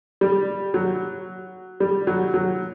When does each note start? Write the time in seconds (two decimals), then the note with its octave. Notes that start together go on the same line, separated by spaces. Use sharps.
0.21 G3
0.74 F#3
1.80 G3
2.07 F#3
2.34 F#3